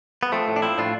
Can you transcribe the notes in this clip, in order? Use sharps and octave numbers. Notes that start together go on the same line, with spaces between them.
B3
F3 A3 C4
A2
D4
F3 C4 E4
A2 D4 F4